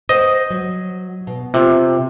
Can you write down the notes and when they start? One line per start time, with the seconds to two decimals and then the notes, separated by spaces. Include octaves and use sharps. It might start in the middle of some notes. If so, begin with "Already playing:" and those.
0.09 C5 D#5 F#5
0.50 F#3
1.27 B2
1.54 C3 F4